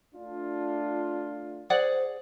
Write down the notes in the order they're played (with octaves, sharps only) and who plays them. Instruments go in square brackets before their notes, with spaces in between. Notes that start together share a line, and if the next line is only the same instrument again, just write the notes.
[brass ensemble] A3 D4 F4
[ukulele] G#4 D5 F#5 [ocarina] C5